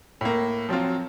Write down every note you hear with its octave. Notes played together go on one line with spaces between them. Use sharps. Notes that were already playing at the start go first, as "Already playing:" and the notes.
A2 A#3
F3 F#3 C4 F4